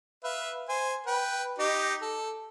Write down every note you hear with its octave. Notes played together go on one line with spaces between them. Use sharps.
B4 E5 F5
C5 G#5
B4 G5
D#4 G4 D#5
A4